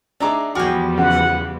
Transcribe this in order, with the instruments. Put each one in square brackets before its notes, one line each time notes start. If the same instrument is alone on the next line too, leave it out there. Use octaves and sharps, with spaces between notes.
[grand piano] D4 D#4 G#4 [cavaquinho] E5 A#5 D6
[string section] E2 F3 G3 [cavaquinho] F#4 G5 [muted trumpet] G#4 [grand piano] D6 F6
[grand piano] C#3 [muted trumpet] F#5